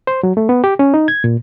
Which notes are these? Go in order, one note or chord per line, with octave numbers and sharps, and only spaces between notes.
C5
F#3
A3
B3
G4
C#4
D#4
G#6
A#2